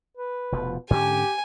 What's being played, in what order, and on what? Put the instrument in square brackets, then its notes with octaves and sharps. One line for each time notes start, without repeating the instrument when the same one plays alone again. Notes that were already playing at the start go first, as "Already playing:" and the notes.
[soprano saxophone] B4
[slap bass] F1 B2 F3
[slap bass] G#2 D3 C#4 [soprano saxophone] G4 [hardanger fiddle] G#5